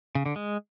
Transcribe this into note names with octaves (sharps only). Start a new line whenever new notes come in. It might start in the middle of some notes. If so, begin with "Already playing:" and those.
C#3
D3
G#3